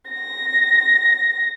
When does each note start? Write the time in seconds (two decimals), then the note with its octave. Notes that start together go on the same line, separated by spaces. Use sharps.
0.11 A#6